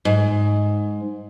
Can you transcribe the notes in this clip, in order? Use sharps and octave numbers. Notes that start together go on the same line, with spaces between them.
G#2